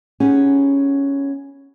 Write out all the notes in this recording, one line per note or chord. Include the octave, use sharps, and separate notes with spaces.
B3 C#4 D#4 G4 G#4